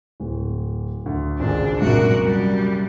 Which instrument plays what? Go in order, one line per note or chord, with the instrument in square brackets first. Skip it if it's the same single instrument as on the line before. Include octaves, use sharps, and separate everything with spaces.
[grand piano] D1
D2
[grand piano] G#1 C#2 G#4 [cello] D4
[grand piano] C2 F#2 A#2 [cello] F#4 A#4
[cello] G3